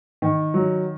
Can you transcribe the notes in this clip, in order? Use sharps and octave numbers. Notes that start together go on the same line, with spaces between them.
D#3
F#3